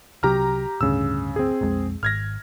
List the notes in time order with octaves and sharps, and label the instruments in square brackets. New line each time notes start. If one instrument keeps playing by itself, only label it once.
[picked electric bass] C2 C3 F#3 [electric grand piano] G4 A#5 F6
[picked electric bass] D1 D2 G2 [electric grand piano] C#3 E6
[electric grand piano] C4 G#4
[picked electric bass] B1 F2 G#3
[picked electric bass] G#1 [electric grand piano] F6 G#6 A#6